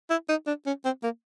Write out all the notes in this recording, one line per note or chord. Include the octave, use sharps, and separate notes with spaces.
E4
D#4
D4
C#4
C4
A#3